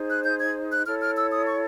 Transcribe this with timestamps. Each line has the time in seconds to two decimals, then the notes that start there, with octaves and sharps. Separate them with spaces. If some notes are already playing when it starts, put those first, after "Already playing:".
Already playing: D#4 G#4 C5
0.09 F#6
0.24 G6
0.40 G#6
0.70 F#6
0.85 E4 A4 C#5 F6
1.00 F6
1.16 E6
1.31 D#6
1.46 C#6